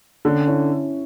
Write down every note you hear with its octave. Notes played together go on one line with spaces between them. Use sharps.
D3 C#4
C#4 E4